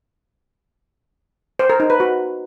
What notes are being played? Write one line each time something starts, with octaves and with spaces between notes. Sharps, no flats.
C5
A#4
D#4
B4
F#4